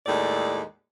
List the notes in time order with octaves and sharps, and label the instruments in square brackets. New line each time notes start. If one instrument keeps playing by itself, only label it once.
[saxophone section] D#2 A2 G3 G#3 D5